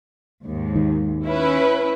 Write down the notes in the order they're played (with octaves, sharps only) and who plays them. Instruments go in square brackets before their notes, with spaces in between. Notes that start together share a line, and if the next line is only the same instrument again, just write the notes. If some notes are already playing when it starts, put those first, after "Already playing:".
[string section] D#2 G#2
[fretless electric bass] D#3
[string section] C#4 E4 B4